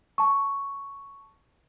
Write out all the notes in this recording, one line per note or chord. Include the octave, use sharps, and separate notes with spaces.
A5 C#6